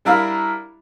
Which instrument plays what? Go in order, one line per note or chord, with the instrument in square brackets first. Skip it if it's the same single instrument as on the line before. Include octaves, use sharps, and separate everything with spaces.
[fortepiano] G3 D4 E4 A#4 E5 F5